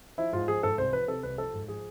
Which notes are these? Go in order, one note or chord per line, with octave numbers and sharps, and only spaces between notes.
F3 E4
G#2 F4
F3 G#4
G#2 A4
C2 C5
F3 B4
C3 A4
C2 B4
F3 A4
G#2
F3 G#4